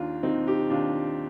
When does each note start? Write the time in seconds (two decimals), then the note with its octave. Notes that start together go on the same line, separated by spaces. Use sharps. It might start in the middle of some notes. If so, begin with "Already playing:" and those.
Already playing: D#2 D4 F4
0.23 D#3 C4 D#4
0.47 D#4 G4
0.70 D#2 D4 F4